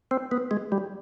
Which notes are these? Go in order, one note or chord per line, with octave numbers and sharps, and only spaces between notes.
C4
B3
G#3
G3